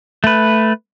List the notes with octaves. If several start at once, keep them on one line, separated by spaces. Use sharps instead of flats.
A3 B4